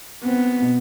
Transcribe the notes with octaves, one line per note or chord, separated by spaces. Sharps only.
B3 C4
B2